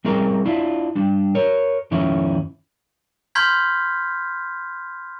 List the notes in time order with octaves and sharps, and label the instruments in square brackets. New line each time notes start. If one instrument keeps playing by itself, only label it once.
[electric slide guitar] G3 C4 G#4 A#4
D4 E4 F4
G3 D4
A#4 C#5
F2 D#3 C#4 E4
[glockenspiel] B5 C6 F6 G6 G#6 B6